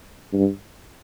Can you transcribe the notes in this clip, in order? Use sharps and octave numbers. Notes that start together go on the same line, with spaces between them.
G2